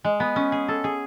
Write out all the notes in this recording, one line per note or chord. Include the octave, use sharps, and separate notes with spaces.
G#3
B3
C#4
G#4
A4
G#4